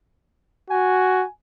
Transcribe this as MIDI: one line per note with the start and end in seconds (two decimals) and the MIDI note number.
0.70 1.24 66
0.70 1.28 80